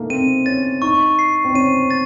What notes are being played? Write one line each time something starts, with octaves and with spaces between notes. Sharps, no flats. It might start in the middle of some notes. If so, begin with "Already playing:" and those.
Already playing: A3 A#3 D#4
C4 D#7
C#4 A6
D#4 C#6
C7
C4
C#4 D#7
A6